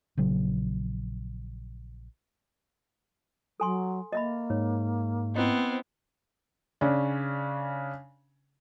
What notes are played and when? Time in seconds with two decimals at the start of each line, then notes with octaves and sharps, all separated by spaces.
0.17 A#1 C#3 F#3
3.60 F#3 A4 G#5 C6
4.13 A#3 D#5 E5 B5
4.50 G#2 C#5
5.36 B3 C4 E4 C5 D#5
6.81 C#3 C#4 D4